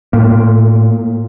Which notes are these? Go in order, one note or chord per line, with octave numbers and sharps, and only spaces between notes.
A2 A#3